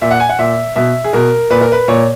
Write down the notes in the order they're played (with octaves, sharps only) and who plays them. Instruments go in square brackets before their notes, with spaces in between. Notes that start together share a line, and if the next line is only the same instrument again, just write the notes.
[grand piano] A#2 E5
F#5
G#5
F#5
A#2 E5
B2 E5
G#4
B2 A#4
A#2 B4
A#4
B4
A#2 C#5